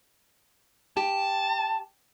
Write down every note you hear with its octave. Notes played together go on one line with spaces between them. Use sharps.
G4 G5 A5